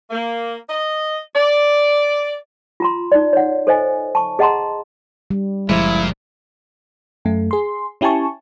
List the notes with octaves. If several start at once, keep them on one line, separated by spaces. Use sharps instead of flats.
A#3
D#5
D5
F4 A#5 C6
D#4 D5
C#5 F#5
A4 C5 D#5 G#5
A5 C#6
G#4 D#5 F#5 A5 A#5 C6
G3
F#1 A#2 F3 G#3 E4
F#2 A3
G#4 C6
C#4 E4 G4 G#5 A5 C#6